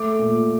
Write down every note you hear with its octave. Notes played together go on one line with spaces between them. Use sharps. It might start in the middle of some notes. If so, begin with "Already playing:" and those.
Already playing: A3 D6
A#2